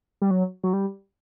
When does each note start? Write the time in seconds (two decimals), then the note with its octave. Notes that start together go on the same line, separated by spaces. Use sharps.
0.22 G3
0.31 F#3
0.64 F#3
0.73 G3